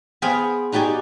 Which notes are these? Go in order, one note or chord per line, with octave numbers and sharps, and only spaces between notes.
B3 G#4 C5 F5 G5
D#4 F#4 G4 D5 G#5